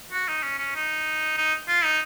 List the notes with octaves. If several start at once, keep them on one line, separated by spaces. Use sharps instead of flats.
F#4
D#4
C#4
C#4
D#4
D#4
F4
D#4